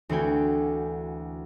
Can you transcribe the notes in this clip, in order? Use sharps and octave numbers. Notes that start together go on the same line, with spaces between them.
D2 E3 C4 F#4 G5 G#5